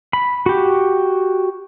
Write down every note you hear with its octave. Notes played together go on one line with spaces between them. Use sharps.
B5
F#4 G4